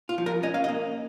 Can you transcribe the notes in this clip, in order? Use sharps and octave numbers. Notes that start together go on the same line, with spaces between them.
F4
F3
A#4
C#4 D#5
F5
D#5
A#3